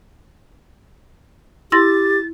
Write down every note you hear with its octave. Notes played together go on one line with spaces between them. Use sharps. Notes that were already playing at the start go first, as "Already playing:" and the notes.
E4 G4 C6 A6 A#6